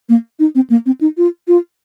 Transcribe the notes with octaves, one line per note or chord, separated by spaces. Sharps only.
A#3
D#4
C4
A#3
C4
D#4
F4
F4